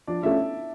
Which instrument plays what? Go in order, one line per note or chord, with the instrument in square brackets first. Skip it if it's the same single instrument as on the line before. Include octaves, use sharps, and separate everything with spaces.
[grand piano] F3 [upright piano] D4 D5
[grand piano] A3 C#4 F4 [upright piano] E4 E5